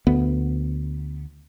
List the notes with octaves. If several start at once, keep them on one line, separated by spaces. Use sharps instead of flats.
D2 B3